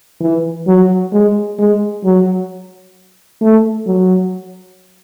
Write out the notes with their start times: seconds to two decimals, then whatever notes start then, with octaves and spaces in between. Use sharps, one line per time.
0.20 E3
0.67 F#3
1.13 G#3
1.59 G#3
2.05 F#3
3.42 A3
3.87 F#3